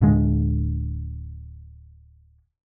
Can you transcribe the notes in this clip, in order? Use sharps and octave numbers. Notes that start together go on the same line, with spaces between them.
D1 D3 G#3